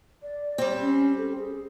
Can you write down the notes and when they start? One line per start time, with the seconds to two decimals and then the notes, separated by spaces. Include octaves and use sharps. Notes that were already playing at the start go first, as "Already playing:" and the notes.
0.22 D5
0.58 G3 C4 C#5
0.81 C#4
1.17 A4
1.36 G#4